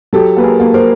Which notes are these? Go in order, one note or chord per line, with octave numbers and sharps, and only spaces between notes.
F#3 G4 A4
A#3 B4
G#4 A#4
A#3
A#4 C5